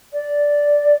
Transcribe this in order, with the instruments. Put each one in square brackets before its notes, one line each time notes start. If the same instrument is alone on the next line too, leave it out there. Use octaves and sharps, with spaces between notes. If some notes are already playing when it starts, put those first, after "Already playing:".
[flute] D5